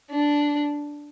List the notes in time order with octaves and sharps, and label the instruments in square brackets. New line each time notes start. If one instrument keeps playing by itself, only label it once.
[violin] D4